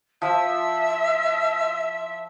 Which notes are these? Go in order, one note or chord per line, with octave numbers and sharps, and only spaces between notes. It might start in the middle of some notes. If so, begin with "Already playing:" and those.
F3 E5